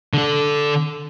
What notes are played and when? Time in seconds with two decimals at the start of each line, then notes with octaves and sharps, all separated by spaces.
0.13 D3 A4